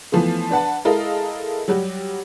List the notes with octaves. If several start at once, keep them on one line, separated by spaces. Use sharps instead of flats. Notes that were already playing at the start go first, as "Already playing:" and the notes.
E3 F3 A3 B3
D4 B4 F#5 A5
G#3 E4 A4 A#4 D#5 F5
F#3 G3 F#4 G4